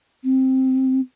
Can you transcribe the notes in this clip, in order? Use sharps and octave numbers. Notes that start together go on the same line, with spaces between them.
C4